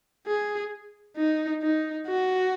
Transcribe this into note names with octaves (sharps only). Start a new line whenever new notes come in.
G#4
D#4
D#4
F#4